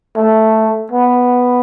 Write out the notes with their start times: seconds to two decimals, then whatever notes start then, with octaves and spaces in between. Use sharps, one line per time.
0.16 A3
0.92 B3